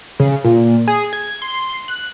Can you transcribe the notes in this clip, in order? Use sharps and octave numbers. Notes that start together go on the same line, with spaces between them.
C#3
A#2
G#4
G#6
C6
F#6